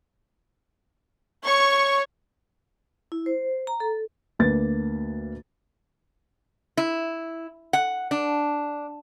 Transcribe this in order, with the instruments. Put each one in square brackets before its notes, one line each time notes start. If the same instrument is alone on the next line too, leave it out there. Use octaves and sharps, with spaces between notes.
[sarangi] C#5 [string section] C#6
[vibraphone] E4
C5
A#5
A4
[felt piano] D2 A#3 B4 A6
[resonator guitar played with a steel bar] E4
F#5
D4